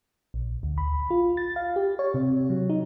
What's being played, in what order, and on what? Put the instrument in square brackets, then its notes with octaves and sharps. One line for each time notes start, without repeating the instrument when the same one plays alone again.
[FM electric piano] A#1
D2
B5
F4
A6
F5
G4
C#5
C3
F#3
D#4